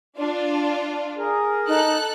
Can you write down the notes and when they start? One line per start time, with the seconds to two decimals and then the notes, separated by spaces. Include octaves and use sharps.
0.18 D4 F4
1.17 G#4 A#4
1.68 D#4 A4 F#6